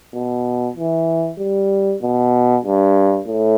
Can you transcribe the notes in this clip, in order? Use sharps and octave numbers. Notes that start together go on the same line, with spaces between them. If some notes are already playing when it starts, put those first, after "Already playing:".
B2
E3
G3
B2
G2
A2